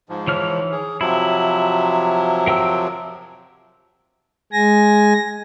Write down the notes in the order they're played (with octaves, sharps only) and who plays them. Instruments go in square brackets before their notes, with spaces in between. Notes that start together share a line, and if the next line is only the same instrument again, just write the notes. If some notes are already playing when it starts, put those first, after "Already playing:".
[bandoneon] G#2 F3
[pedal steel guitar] E3 C#5 F6
[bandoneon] G#4
[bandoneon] C3 F3 F#3 [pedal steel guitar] E4
[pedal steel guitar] A#4 G5 E6
[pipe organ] G#3 G#5 A#6